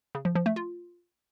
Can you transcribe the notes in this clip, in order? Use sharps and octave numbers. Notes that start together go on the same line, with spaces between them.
C#3
F3
F3
A3
F4